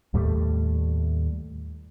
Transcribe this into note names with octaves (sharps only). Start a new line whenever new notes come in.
D#2 A2 G3 A3